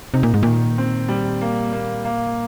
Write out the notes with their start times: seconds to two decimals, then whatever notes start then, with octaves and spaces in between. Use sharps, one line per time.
0.14 C3 D#4
0.23 A#2
0.34 G#2
0.43 A#2 D#3
0.78 C4
1.09 G3
1.41 A#3
1.72 A#3
2.05 A#3